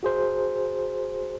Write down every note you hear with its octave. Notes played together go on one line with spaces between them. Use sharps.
F#4 G#4 C5